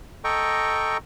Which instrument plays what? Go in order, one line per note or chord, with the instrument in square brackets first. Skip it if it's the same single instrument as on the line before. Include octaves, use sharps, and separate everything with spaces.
[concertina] A4 D#5 G5 A#5 C#6